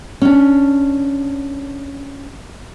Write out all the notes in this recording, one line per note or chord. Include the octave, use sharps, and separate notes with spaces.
C#4 D4